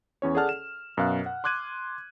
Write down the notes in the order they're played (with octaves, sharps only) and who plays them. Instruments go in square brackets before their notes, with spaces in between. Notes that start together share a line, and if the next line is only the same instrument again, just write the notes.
[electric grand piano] E2 C#4 C#5
G#4 A4 D5 F#5 A5 F6
E7
F#2 B2 F5 F#6
F#5
C6 D6 F#6 G#6 D#7